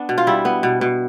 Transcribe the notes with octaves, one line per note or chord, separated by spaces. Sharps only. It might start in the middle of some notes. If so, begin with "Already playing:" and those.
Already playing: B3 D4
B2
F4
G3 E4
B3
B2
B2